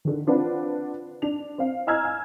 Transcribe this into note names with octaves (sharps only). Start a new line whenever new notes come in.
D3 D#3
C4 D4 F4 B4 F#5
D4 F7
C4 F5
D#5 G#5 A#5 E6 F6 G#6
G#5